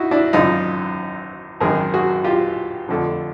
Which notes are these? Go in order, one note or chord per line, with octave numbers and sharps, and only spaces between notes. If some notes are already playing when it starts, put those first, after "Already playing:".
Already playing: D#4 E4 F#4
D4 E4
G#1 F#2 C#3 D#4 F4
G#1 F#2 D#3 G#4 A#4
F#4 G#4
F4 G4
F2 D3 F3 A3